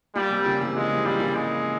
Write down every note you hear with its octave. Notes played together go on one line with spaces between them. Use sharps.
A#2 G3
C3
A#2 C#3
C3 E3
C#3 F3 G#3
C3 E3
A#2 C#3 G3
A#2 C#3
G#3